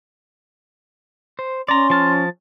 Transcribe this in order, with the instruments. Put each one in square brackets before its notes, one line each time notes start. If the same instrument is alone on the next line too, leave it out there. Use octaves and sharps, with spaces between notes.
[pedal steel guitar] C5
[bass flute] C#4 [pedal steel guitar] D5 A#5 [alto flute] C6
[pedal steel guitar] F3 A5 F6